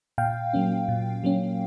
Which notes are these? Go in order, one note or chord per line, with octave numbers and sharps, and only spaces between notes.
A#2 F5 G5
F#3 A#3 C#4
A#2
F#3 A#3 C#4